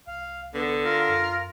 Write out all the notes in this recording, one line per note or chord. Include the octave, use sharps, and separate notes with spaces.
C2 F5
D3 B3
F4 A#4
F#2